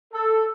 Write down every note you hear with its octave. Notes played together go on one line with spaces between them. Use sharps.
A4